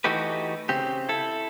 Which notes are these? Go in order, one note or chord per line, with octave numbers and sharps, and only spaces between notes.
E3 A3 D#4 F#4 G4 B4
C#3 C4 G4
E4 A4